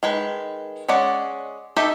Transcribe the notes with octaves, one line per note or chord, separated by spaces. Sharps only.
D#3 G#3 B4
G#3 C#4 D5 F#5
D#4 G4 A4 E5